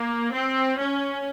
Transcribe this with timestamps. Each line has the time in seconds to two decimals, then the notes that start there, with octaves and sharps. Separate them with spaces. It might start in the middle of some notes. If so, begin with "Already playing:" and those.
Already playing: A#3
0.33 C4
0.78 C#4